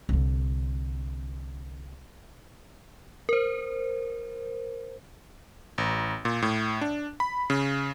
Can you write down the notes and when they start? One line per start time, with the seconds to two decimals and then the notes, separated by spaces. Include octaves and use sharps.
0.09 C2 D3
3.29 A#4 C5
5.78 A1
6.25 A#2
6.42 A2
6.81 D4
7.20 B5
7.50 C#3